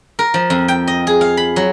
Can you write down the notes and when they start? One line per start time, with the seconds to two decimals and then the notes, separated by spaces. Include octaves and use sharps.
0.19 A#4
0.34 F3
0.50 F2
0.68 G5
0.87 D#5
1.07 G#4
1.21 F5
1.37 B5
1.56 F#3